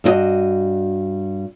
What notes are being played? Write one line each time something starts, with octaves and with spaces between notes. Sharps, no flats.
G2 E4 F#4 D#5